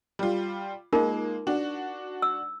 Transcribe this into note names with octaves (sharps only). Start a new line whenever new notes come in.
G3 F4
G#3 A#3 D#4 F4 A#4
D4 F#4
E6